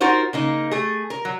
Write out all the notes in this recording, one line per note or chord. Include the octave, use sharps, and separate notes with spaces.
D#4 F4 F#4 A#4 C5
C#3 A#3 D#4
A3 G#4
A#4
F#3